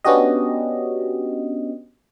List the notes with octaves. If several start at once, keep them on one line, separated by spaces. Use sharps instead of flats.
B3 C#4 D4 F#4 G4 D#5